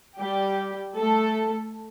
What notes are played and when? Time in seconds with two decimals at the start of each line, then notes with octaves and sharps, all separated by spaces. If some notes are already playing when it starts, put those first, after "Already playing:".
0.19 G3 G4
0.96 A3 A4